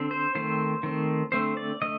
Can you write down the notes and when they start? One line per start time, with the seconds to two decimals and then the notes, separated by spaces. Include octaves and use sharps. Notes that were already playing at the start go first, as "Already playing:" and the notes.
Already playing: D3 C4
0.11 C5
0.35 D#3 A3 C4 C5
0.83 D#3 A3 C4
1.32 D3 A3 C4 C5
1.57 D5
1.81 D3 A3 D#5